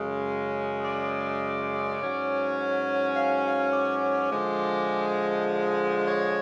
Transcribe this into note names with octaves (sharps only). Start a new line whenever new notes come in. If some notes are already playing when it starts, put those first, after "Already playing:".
Already playing: F#2 C#3 G#3
D5
G#2 F#3 C#4
F5
F5
D5
D3 F3 G#3
C#5